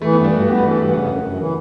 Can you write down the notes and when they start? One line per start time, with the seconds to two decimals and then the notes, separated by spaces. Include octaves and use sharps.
0.02 E3 A3
0.13 G2 B3
0.24 D4
0.33 G2 F#4
0.48 B3 G4
0.58 E3 B4
0.71 A4
0.78 G2 B4
0.93 C#3 F#5
1.08 F#2
1.23 F#2
1.39 E3